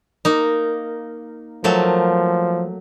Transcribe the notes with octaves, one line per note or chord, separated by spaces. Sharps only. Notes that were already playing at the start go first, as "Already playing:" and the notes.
A#3 D#4
F3 F#3 A3 A#3